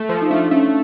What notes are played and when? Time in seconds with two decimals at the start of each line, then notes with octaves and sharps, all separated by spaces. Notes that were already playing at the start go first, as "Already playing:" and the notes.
Already playing: A3
0.09 F3
0.22 D#4
0.30 A3 D4
0.51 A3 C#4